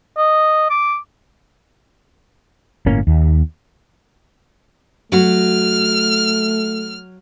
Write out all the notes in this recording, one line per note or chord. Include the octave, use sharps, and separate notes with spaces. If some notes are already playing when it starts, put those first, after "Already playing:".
D#5
D6
G1 A2 A#3 C#4
D#2
F#3 A3 F#4 F6